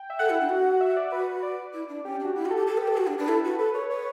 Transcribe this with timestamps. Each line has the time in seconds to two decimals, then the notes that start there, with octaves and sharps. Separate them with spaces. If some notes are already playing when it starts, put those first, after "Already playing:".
Already playing: G5
0.10 E5
0.19 A4 F#5
0.30 E4
0.40 D4
0.49 F#4
0.81 E5
0.97 D5
1.12 F#4 B4
1.43 D5
1.73 E4
1.88 D4
2.05 C#4 G4
2.15 G4
2.20 D4
2.25 F#4
2.35 E4 G4
2.45 F#4
2.51 A4
2.56 G4
2.67 G4 A4
2.77 B4
2.82 G4
2.87 A4
2.97 F#4
3.07 D4
3.18 D4
3.21 B4
3.28 E4 A4
3.44 F#4 B4
3.58 A4 B4
3.74 B4 C#5
3.90 B4 C#5